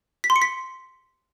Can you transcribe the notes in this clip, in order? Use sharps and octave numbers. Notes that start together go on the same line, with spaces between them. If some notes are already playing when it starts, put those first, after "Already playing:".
B6
C6
C#7
B6